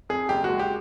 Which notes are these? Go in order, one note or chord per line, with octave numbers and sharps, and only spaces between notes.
F2 G#4
F#1 G4
G#3 F#4
G4